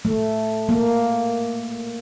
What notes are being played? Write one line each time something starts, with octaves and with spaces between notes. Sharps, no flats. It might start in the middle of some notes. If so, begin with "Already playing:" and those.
A3
A#3